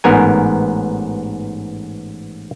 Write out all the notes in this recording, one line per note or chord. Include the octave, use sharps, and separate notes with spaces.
A1 G#2 B3 A#4 G#5